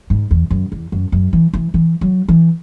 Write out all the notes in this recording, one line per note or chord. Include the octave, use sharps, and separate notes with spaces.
G#2
E2
F#2
E2
F#2
F#2
E3
E3
E3
F#3
E3